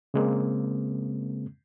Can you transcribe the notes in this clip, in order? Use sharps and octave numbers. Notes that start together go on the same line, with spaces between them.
C#3 G#3 A#3 C4